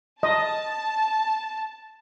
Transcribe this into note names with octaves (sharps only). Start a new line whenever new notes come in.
D#5 A5